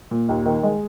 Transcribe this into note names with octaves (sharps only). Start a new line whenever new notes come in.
A#2
D#2
D#3
G#3